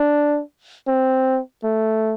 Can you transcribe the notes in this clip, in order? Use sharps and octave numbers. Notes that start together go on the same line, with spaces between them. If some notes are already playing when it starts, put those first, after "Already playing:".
Already playing: D4
C4
A3